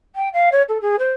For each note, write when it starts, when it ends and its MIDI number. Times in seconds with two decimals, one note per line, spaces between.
0.15 0.28 79
0.33 0.49 77
0.51 0.62 73
0.68 0.80 69
0.81 0.95 68
0.99 1.13 72